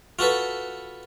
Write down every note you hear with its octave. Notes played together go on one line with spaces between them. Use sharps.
F4 F#4 A4 B4